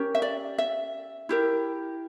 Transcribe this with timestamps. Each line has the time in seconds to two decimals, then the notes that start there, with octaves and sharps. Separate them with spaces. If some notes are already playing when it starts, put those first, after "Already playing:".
Already playing: C#4 G4 A#4
0.15 E5
0.22 D5
0.58 E5
1.29 E4 G4 A#4